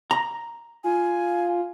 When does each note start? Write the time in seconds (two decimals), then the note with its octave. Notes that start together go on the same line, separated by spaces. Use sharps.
0.11 A#5
0.84 F4 G#5